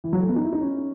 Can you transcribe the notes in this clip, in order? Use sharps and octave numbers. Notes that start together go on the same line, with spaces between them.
E3
F#3
A3
B3
D#4
E4
D#4
C#4